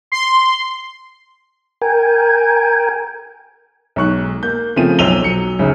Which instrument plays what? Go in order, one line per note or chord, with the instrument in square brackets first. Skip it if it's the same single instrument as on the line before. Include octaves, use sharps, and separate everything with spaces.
[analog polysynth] C6
[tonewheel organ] A#4 G5 G#5
[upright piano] B1 G#2 C#6 F#6
A#3 G6
C#3 F3 A3 C4 G#4 D#7
B1 C5 E6 D#7 F7 G7
B1 F#3 C#7
G1 D2 G#2 C#3